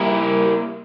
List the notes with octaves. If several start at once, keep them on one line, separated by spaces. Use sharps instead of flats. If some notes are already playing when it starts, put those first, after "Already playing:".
Already playing: G3 A#3 E4 A#4